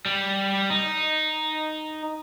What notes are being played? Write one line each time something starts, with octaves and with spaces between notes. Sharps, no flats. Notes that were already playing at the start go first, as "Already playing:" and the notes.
G3
D#4